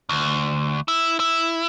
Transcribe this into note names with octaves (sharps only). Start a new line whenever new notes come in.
D2
E4
E4